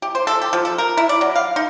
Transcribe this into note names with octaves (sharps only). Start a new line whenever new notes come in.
G4
C5
A4
G4
F3
A4
A#4
E4
D5
F#3
F5
D#4